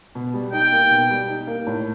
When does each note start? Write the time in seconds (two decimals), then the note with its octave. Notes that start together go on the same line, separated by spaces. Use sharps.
0.15 B2
0.34 G3
0.53 D#4 G5
0.72 A#3
0.90 B2
1.10 G3
1.28 D#4
1.47 A#3
1.67 A2